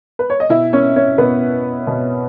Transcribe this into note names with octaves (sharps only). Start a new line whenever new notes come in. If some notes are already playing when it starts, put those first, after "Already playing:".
B4
C#5
D#5
B2 E4 E5
C#4 C#5
C#4 C#5
B2 B3 B4
B2